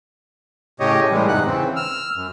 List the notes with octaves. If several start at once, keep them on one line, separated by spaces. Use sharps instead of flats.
A2 C#3 G4 C#5 D#5
A2 E3 G3 G#3
E2 G#2 C3 D#4 F#5 F#6
C#3 E3 C4
E6 F6
F#2